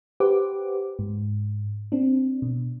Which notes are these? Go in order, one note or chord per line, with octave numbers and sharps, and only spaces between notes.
G4 B4 C5 F#5 D6
G#2
C4 D4
B2